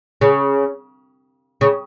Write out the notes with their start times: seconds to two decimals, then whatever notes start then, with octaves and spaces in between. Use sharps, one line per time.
0.21 C#3
1.61 C#3